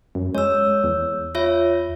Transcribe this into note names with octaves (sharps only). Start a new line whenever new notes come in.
F#2
G#3 C#5 E6
E2
F4 C#5 E5